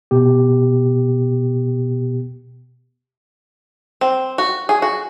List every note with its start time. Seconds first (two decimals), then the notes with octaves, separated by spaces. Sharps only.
0.11 B2 B3 G4
4.01 C4
4.38 F#4
4.69 G#4
4.82 F#4